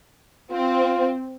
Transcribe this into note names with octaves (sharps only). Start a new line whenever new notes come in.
C4 F4